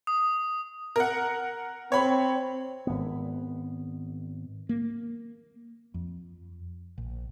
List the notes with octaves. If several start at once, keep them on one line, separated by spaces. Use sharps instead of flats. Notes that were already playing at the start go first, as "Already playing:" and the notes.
D#6
A#4 F#5
C4 C#5 B5
G#1 B3
A#3
F2
A#1